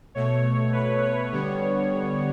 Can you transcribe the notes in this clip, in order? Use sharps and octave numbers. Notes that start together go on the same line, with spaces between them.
B2 A3 C#5
B4
C#5
D3 G3 B3